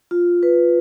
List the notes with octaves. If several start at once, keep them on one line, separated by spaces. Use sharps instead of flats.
F4
B4